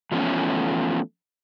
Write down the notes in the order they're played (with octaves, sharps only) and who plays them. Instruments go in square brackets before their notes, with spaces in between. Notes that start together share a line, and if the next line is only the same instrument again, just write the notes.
[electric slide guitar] E3 F3 A3 B3 C#4